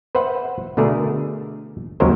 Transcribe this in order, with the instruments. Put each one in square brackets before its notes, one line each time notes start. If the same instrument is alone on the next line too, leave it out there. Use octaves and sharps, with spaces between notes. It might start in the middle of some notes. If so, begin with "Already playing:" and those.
[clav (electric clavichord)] B4 C5 E5 F#5
B2 D3 A3 G#4 A#4
D#2 C#3 F#3 G#3 A#4 C5